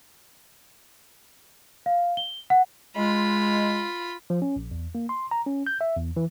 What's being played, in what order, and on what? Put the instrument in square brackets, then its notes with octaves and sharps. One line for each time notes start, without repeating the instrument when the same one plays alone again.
[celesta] F5
G7
F#5
[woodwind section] G#3 [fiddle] F4 B5
[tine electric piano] F3
C#4
A#1
E2
A#3
C6
A#5
C#4
G6
E5
E2
E3